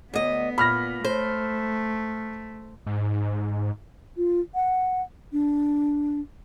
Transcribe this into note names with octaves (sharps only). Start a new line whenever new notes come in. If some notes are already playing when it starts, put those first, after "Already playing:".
D2 B3 D#5
A#2 B5 F6 A#6
A3 C5
G#2
F4
F#5
D4